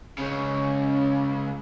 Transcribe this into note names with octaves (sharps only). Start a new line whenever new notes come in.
C#2 C#3 C#4